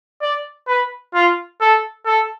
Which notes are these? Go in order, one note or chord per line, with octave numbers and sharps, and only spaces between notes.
D5
B4
F4
A4
A4